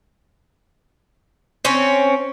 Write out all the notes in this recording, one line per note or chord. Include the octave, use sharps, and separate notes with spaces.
C4 C#4